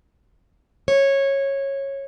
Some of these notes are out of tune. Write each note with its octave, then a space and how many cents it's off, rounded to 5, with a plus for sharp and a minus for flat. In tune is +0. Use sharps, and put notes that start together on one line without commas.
C#5 -15